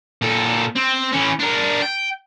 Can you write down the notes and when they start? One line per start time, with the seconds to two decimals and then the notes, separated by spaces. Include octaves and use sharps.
0.22 A#2 A4
0.76 C4
1.12 E3 C#4
1.39 D4 A#4
1.82 G5